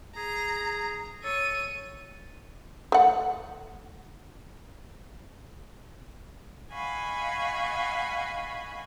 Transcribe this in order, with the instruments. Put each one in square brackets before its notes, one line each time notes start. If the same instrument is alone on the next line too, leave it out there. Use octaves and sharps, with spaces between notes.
[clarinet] G#4 [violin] A#5
[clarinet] A4 [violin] C#5 D#7
[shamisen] A3 F#5
[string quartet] D#5 F5 F#5 G#5 B5 C#6